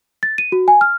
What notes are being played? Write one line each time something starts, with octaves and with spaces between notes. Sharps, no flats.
A6
D#7
F#4
G#5
F6